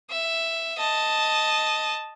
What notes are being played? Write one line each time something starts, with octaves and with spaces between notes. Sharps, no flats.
E5
D#5 A5